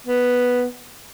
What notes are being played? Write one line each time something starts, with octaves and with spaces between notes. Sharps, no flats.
B3